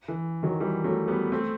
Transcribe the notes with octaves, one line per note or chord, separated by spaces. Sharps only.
E3
D#3 F#3
E3 G3
F#3 A3
G3 B3
A3 C4